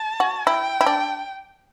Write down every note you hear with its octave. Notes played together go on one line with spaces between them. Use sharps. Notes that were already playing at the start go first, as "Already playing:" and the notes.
Already playing: A5
F#4
E4 G5
E4
D4